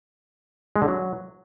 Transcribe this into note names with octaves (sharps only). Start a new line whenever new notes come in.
G#3
D3
F#3